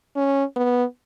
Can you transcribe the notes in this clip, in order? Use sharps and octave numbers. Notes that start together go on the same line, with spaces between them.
C#4
B3